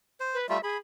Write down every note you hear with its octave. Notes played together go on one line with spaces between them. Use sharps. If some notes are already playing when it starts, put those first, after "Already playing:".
C5
B4
G3 A3 F4 E5
G#4 B5